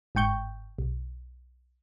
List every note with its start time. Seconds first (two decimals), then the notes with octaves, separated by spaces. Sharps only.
0.15 G1 G#2 G5 C#6 G6
0.78 B1